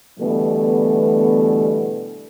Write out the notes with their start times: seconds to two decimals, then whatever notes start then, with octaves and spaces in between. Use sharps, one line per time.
0.19 B2 D3 E3 G3 A3 B3